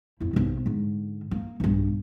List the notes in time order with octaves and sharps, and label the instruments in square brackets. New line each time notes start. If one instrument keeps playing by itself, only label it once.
[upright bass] F2 E4
B1 C3
G#2 D3
A#3
B1 G2